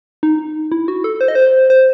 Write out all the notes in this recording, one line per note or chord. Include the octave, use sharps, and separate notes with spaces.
D#4
E4
F#4
A4
C5
D#5
C5
C5